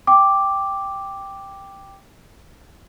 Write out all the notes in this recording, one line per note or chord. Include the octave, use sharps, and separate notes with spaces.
G5 D6